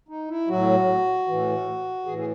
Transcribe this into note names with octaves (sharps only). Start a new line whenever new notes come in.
D#4
E4
A2 F#3 F#4
A2 E3
A2 E3 G#4
G#4